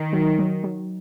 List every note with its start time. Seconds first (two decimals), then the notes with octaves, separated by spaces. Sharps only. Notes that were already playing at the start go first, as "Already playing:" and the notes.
Already playing: D#3
0.13 F#3
0.39 F#3
0.64 F#3